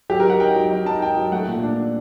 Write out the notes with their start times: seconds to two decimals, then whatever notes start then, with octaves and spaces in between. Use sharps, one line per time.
0.10 F#3 G4
0.20 A#4
0.25 D#4 F#5
0.40 D#4 G5
0.55 F#3
0.71 D#4
0.86 D#4 A5
1.02 D#4 G5
1.17 F#3
1.32 A3 F#5
1.48 A#2
1.63 D4
1.79 D4